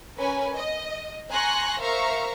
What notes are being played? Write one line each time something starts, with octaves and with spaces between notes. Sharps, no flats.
C#4 A#4 B4 C#5 G#5
D#5
G#5 A#5 C6 C#6 F#6 A#6
A#4 C5 E5 F5 A#5 C#6